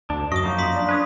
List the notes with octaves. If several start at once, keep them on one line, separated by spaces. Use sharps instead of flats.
D2 D4
F#2 D#5 C#6 D#6
F3 A#3 D#4
C6 D#6 B6
D4
B4 C#5 D#6